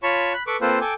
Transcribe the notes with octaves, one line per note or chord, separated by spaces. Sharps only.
F4 C#5 A5 B5 C#6
B5 F#6
A4 B4 B5 C#6 D6
A#3 C4 F4 A4 B4 C5
A4 G5 G#5 D6